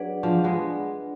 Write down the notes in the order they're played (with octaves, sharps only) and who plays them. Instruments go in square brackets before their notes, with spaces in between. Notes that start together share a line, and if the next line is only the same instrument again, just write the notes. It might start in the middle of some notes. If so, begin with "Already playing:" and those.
Already playing: [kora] F#3 [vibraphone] D4 G#4 B4 D5 F#5
[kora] F3 G#3 [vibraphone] D4
[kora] G#3 B3